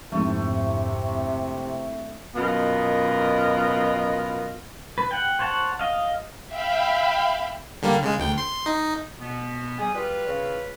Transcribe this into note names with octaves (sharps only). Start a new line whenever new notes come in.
F2 G#2 C3 A3 C4 D4 E4
F#2 B2 B3 F4 A#4 D#5
B4
F#5 G5
C5 C#5 F#5 A5
D#5 F5
E5 F5 G5 B5
D3 G3 A#3
C#3 G#3
D2 G5
C6
D#4
B2 B3
G3 G#4 D#6
G3 F4 B4
C#3